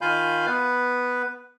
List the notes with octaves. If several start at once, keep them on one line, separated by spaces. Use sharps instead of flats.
D#3 F4 F5 G#5 B5 G6
B3 B4